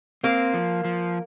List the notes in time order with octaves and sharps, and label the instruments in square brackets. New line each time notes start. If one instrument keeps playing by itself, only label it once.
[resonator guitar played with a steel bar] A#3 [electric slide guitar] C4
[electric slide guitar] F3
F3